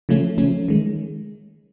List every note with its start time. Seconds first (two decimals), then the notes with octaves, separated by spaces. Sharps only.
0.09 C#3 F3 A3 C#4
0.38 C#3 F3 A3 C#4
0.68 D#3 G#3